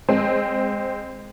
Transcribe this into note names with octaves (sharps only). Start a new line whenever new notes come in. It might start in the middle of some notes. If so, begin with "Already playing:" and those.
G#3 C4